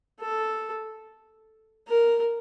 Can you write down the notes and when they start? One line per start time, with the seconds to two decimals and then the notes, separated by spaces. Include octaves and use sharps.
0.20 A4
1.88 A#4